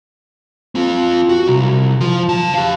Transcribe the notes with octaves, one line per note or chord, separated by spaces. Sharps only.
C4 F4
F#4
C2
F3 F4
C#3 A5
G4 F5